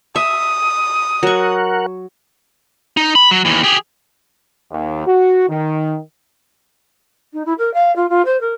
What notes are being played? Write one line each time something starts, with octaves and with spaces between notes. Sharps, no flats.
E5 D#6
F#3 A#4 F#5 C#6
D#4
B5
F#3
D#2 E3
G4 G#4
D#2
F#4
D#3
D#4
E4
A#4
F5
F4
F4
C5
A#4